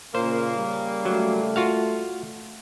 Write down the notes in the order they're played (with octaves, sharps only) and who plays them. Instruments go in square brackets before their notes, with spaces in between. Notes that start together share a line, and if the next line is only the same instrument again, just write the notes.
[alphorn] A#2 [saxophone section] C#3 A#3 [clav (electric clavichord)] C5
[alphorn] G3
[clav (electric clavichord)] F#3 [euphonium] A3
[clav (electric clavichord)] F4 F#4 F5